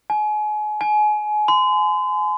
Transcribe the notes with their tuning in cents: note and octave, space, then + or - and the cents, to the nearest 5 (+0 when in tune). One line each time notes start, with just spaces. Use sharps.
G#5 +35
G#5 +30
C6 -40